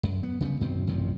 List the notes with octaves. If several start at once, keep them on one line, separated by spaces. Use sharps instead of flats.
F#2
B3
C#3 G3 A#3 B3
F#2 B2 D#3 C4
A1 F#2 C3 F3